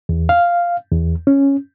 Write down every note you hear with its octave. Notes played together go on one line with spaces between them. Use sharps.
E2
F5
E2
C#4